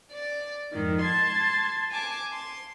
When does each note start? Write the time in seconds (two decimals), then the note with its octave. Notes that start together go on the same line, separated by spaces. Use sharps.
0.11 D5
0.73 F2 G#2 D#3
1.03 A5 C6 G#6
1.91 G#5 A5 D6
2.31 C6